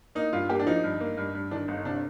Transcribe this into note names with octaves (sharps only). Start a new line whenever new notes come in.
A#3 D#4
G2 F4
A#3 G4
D4
F3 D#4
G2
A#3
G2
G2
D#3 D4
G1 D#4
C3 D4